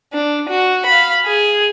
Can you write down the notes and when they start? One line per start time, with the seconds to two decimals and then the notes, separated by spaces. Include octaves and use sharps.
0.13 D4
0.49 F#4
0.86 F5 B5
1.26 G#4